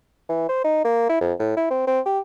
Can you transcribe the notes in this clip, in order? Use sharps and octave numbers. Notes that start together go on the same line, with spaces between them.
E3
C5
D#4
A#3
E4
F2
A2
E4
C4
C4
G4